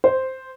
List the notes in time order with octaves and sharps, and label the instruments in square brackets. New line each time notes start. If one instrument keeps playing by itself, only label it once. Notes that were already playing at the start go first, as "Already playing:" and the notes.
[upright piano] C5